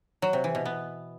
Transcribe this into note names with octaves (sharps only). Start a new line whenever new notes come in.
F#3
C3
E3
B2
B3